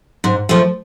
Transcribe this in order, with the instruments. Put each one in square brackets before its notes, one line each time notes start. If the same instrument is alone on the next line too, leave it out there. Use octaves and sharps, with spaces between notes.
[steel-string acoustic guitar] G#2
F3 A3